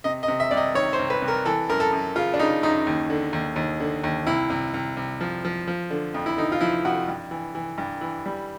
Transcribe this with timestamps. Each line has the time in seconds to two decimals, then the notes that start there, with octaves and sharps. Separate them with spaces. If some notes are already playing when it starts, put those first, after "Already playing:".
0.04 C3 D#5
0.23 D#5
0.28 C3
0.40 E5
0.51 C2 D5
0.57 D#5
0.74 D#3 C#5
0.93 C5
0.99 C2
1.10 B4
1.22 C2
1.28 A#4
1.45 E3 A4
1.69 F#2 A#4
1.80 A4
1.92 F#2
2.15 C#3 F4
2.34 D4
2.39 C#3 D#4
2.63 F#2 D#4
2.87 D#2
3.10 D3
3.33 D#2
3.56 D#2
3.80 D3
4.04 D#2
4.27 C2 E4
4.50 C2
4.74 C2
4.97 C2
5.21 F3
5.45 F3
5.67 F3
5.90 D3
6.14 F2
6.26 E4
6.38 D3 D#4
6.52 F4
6.61 F3 E4
6.85 F2 F#4
7.08 G2
7.31 E3
7.55 E3
7.78 G2
8.01 E3
8.26 G3